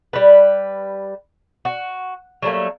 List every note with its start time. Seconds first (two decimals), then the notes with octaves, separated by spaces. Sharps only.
0.13 G3 B4
1.65 F#4
2.42 F#3 G3 A3 A#3